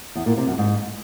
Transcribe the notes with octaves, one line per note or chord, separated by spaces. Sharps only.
E2
A#2
C3
F#2
G#2